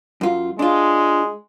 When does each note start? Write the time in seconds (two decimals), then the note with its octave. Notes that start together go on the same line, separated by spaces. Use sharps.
0.21 F#2 F4
0.59 G#3 D4 F4